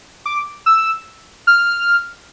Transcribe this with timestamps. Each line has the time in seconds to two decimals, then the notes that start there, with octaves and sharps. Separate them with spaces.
0.26 D6
0.66 E6
1.47 F6